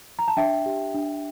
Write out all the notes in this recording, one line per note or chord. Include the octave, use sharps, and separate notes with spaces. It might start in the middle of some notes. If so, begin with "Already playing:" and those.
A#5
A5
D4 E5 G5
G4
D4